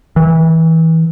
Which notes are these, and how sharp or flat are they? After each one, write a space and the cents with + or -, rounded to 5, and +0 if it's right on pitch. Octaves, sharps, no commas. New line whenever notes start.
E3 -25